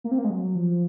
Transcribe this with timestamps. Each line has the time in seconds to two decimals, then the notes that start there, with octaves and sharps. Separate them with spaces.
0.04 A#3
0.11 C4
0.18 A#3
0.24 G#3
0.30 F#3
0.55 F3